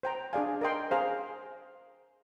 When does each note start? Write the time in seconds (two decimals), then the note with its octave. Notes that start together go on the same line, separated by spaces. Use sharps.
0.03 C5 G5 A#5
0.33 D4 G#4 D5 F5 G#5
0.61 A#4 D#5 G5 C6
0.91 G#4 C5 F5 A#5